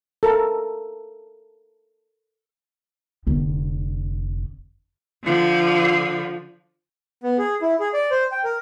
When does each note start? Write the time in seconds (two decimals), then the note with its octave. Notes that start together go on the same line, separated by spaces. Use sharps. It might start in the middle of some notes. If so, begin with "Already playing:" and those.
0.23 A4 A#4
3.27 F1 D3
5.24 D3 F3
7.23 B3
7.38 G#4
7.62 E4
7.80 G#4
7.94 D5
8.11 C5
8.32 G5
8.44 A#4